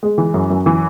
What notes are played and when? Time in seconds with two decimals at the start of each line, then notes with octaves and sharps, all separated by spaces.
0.03 G#3
0.18 E3
0.34 F#2
0.50 F#2
0.66 E3